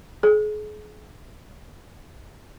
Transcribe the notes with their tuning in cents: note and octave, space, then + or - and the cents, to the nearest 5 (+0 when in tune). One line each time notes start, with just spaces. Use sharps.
G#4 +35